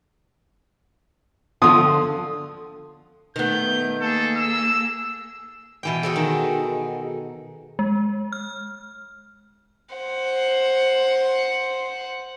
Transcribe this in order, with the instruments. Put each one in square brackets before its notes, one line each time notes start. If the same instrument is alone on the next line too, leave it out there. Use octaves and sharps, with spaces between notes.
[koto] D3 F3 [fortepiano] C6 D#6
[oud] D#3 B3 [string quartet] A3 [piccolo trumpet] G6
[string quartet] A#3 G#4 [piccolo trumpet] A4
[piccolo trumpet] E6
[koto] B2 E3 G5
[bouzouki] F#4 G#4 A4
[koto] D#3
[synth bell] G#3
F6
[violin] C5 F#5